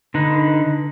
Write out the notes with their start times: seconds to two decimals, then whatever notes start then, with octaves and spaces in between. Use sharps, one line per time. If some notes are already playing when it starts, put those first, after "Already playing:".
0.14 D3 D#4 B4